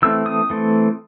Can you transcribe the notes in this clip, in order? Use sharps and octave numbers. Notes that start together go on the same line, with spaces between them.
E3 A3 C4 E6
D#6
E3 A3 C4